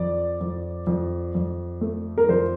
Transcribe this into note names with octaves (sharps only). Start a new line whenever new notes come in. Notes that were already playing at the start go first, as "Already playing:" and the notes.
Already playing: F2 D5
F2
F2
F2
A3
A#4
F2 C5